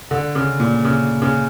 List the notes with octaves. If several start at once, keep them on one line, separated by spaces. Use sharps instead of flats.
D3
C#3
A#2
C#3
C#3